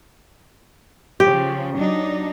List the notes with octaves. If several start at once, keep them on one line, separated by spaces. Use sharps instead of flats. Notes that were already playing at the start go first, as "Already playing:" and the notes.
C#3 F3 G4
F#3 D4 D#4